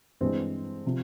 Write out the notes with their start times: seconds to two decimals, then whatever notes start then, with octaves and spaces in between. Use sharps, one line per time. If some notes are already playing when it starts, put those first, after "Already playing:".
0.21 G2 E3 G#3 C4
0.86 C3 F3